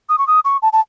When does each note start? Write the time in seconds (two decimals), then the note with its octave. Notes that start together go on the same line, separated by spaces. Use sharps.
0.09 D#6
0.18 C#6
0.27 D#6
0.45 C#6
0.62 A5
0.73 A5